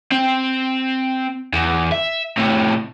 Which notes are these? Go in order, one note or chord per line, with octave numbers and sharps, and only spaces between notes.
C4
E2
E5
A2 C3